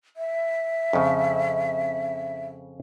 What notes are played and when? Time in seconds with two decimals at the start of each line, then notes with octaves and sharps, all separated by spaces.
0.17 E5
0.93 F2 C#3